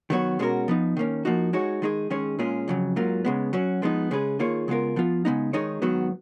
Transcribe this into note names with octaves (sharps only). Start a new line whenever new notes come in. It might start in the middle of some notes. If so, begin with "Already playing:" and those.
D#3 F#3 B3 F#4 C#5
B2 G#3 C#4 F#4 A#4
F3 B3 D#4
D#3 A#3 C#4
F3 A#3 D#4 F#4
G#3 D#4 F#4 C#5
D#3 G#3 D#4 G#4
D#3 G#3 C#4 G#4 C#5
A#2 G#3 C#4 F4 G#4
F2 C#3 F#3
G#2 F#3 A#3 F4
C#3 G#3 B3
F#3 C#4 F#4
F3 G#3 B3 D#4
C#3 G#3 C#4 G#4 B4
D#3 A#3 F4 G#4 C#5
C#3 G#3 B3 F4 A#4
F3 B3 F4
C#3 G#3 B3 D#4
D#3 G#3 D#4 G#4 C#5
G#2 D#3 F#3 B3 F#4